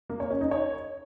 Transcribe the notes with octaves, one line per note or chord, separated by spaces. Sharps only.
A#3
C#5
C#4
D#4
C#5